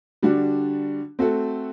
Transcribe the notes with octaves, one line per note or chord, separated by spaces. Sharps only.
D3 G3 D4 F#4
A3 C4 F#4 A4